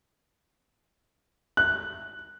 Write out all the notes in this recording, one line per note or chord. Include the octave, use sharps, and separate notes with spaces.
F#6